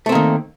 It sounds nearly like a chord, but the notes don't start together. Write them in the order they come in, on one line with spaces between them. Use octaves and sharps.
A3 C4 A#3 D#3